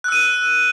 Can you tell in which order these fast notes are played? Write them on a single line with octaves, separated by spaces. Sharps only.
F#6 E6 D#7